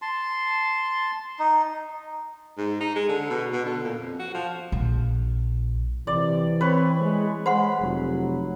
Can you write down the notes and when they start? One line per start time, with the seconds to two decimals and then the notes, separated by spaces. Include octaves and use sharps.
0.02 A5 C6
1.39 D#4
2.57 G#2
2.81 D#4
2.96 G#3
3.09 D3
3.30 B2
3.52 B2
3.65 D3
3.84 A#2
3.99 F2
4.20 F#4
4.34 F3
4.72 A#1
6.07 C3 E3 D5
6.61 C4 B4 C#5
7.01 G#3
7.46 G#3 C5 F#5 B5 C6
7.80 F1 F#3